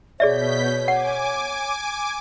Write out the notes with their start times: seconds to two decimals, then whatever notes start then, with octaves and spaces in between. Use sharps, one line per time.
0.20 B2 G#4 C#5 D5 E5 G6 B6
0.88 F#5 G#5 D6